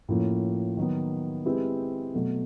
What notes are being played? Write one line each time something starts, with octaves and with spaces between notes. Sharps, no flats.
A2 F3 A#3 C#4
D#3 F#3 B3
G#3 C4 E4 G4 B4
B2 F#3 A3